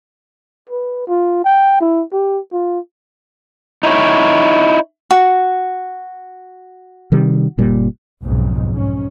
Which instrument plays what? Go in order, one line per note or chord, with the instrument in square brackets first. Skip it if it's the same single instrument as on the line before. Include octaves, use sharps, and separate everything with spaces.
[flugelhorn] B4
F4
G5
E4
G4
F4
[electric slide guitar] D#4 E4 C#5
[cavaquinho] F#4
[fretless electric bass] C3 D#3 G3
F#1 A#2 G3
[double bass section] B1 F2 G#2 C#3
G#2 C#4